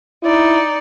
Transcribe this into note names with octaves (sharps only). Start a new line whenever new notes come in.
D#4 E4 D5